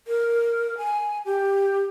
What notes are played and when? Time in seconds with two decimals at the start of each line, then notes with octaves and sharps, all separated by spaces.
0.07 A#4
0.78 G#5
1.25 G4